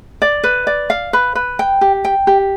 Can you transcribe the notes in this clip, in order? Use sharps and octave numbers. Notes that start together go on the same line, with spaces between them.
D5
B4
D5
F5
B4
B4
G5
G4
G5
G4